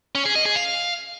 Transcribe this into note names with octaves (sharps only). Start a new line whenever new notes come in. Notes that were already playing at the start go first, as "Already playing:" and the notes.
C#4
G#4
D#5
G#4
F5